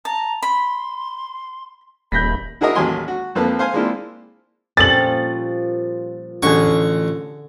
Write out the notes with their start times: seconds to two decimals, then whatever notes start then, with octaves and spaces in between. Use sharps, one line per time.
0.05 A5 A#5
0.42 B5 C6
2.12 D#1 B5 G6 A#6 B6
2.61 E4 F#4 G#4 A#4 D#5 E5
2.75 A1 D#2 F#3 G4 G#5 C6
3.08 F#4
3.35 F2 F3 A#3 B4 A5
3.59 C5 F5 G#5
3.74 G#3 A#3 C4 D4 E4 F4
4.77 A#2 F3 G3 C#4 A4 A6 F#7
6.43 A1 D3 G#4 C#6